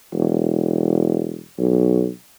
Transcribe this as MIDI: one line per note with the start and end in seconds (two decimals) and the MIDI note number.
0.14 1.43 28
1.58 2.08 35